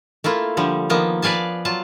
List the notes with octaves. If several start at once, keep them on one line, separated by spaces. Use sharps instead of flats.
A3 A#3 E4 F4
D3 F3 G3
D#3 F3 A#3 B3
B4 D5 F5 G#5 A5
F#3 F4 A5